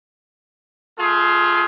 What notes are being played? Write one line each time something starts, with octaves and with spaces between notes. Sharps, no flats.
A3 F4 G#4